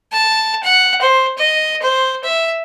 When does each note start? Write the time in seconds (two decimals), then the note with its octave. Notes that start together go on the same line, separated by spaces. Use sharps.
0.12 A5
0.63 F#5
1.01 C5
1.38 D#5
1.82 C5
2.24 E5